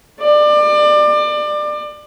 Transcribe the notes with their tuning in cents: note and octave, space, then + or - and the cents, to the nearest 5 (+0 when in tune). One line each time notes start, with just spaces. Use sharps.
D5 +30